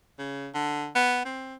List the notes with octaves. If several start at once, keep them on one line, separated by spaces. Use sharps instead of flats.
C#3
D3
B3
C4